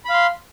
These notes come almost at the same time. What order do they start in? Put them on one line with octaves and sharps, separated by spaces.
B5 F5 C6